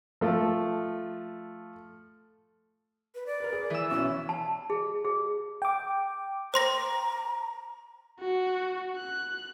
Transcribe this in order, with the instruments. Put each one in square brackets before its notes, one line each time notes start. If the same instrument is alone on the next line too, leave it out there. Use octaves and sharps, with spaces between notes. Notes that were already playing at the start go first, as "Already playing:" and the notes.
[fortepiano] F3 A3
[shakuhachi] B4
D5
[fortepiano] A#4 B4
G#4
[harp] E3 E6
[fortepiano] B1 C#4 C#6 [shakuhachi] E4
[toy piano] A5
G#4
G#4
[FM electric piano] G5 D6
[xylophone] C5 C6 A#6 [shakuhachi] A#5
[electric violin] F#4
F#6